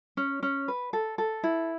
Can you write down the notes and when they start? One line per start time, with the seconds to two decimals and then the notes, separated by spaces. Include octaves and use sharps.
0.17 C#4
0.43 C#4
0.68 B4
0.93 A4
1.18 A4
1.43 E4